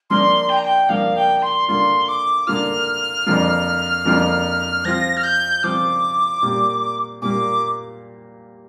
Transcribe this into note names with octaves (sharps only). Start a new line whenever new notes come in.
F3 A#3 D4 A#4 C6
G5
A#5
G5
F3 A#3 D4 A#4 F5
G5
C6
D3 A#3 F4 A#4 C6
D6
D3 A#3 F4 A#4 F6
F2 D3 F3 A#3 F4
F2 D3 F3 A#3 F4
F3 C4 F4 A#6
F6
G6
F3 C4 F4 D6
A#2 G3 A#3
A#2 G3 A#3 D6